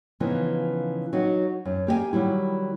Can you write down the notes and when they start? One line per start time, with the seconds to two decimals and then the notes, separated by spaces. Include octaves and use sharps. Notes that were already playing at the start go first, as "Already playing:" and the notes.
0.20 C#3 E3 F3 B3 D#4
1.13 F#3 D#4 F#4
1.65 F#2
1.87 A#3 G4 D#5 G#5
2.13 D#3 F#3 G3 E4